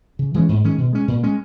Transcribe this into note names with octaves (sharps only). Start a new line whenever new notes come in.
C#3
E3 G#3 C#4
G#2
D#3 G#3 C#4
B2
G#3 C#4
A#2
G#3 C#4